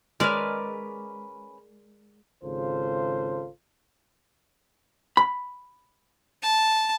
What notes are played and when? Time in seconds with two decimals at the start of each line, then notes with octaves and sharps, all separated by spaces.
0.20 G#3 C#4 A#4 B4 D5 F6
2.43 G#1 C#3 F4 A4 C5
5.17 B5
6.43 A5